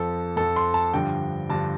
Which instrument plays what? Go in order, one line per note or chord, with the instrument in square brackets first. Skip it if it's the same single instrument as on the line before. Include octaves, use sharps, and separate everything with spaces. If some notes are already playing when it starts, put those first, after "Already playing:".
Already playing: [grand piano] F2 F3 A4
F2 F3 A4
C6
A5
G2 D3 F3 G5
G2 D3 F3 A5